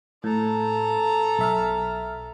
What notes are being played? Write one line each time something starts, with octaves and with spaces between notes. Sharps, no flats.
A2 A4 A#5
B1 E5 F6